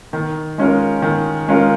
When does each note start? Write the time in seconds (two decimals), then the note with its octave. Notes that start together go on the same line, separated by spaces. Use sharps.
0.13 D#3
0.58 G#3 C#4 F4 A#4
1.02 D#3
1.48 G#3 C#4 F4 A#4